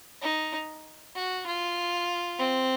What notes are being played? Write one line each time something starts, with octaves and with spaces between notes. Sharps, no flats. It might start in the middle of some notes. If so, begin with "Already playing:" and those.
D#4
F#4
F4
C4